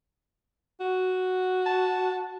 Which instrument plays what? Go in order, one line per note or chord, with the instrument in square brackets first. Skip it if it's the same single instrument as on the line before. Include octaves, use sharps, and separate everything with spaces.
[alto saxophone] F#4
[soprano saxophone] A5